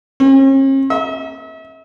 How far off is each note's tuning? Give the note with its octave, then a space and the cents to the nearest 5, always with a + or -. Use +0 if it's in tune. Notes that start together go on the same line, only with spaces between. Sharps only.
C#4 -45
E5 -40